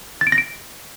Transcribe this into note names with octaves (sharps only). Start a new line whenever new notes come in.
A6
D7
A#6
D7